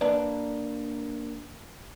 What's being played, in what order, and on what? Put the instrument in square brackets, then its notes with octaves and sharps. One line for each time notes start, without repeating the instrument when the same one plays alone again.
[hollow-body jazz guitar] A#3 D4 B4 D5